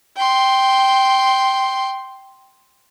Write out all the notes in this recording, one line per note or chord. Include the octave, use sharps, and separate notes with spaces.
G5 C6